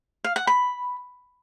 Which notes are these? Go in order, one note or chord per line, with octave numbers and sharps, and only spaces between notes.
F5
F#5
B5